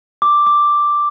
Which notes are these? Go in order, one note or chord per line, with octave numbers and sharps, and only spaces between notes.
D6
D6